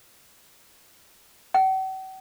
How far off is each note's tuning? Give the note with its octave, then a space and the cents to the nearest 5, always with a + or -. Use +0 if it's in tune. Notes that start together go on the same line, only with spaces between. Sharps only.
F#5 +45